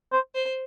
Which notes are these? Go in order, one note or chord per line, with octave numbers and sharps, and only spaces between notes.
C5
C5